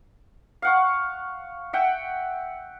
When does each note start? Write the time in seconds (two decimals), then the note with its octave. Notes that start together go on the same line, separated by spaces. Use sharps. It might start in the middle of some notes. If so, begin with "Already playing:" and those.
0.62 F5 F#5 C#6
1.73 E5 F#5 G5